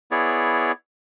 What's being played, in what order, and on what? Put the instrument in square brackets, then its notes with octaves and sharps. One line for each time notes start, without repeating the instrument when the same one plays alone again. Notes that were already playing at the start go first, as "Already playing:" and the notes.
[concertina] B3 E4 G#4 C#5 D5